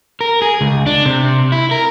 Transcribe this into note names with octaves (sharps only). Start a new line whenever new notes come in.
A#4
G#4
C#2
D4
C3
E4
A#4